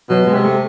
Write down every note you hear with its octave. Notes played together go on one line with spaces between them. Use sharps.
B2 F#3
G#3
C3
A3